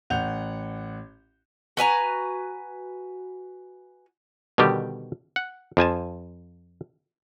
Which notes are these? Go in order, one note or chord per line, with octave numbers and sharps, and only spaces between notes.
A1 F#5 G6 F7
F#4 B4 G#5 A#5
B2 D3 D#3 G3 G4
F#5
F2 F3 G#5 A5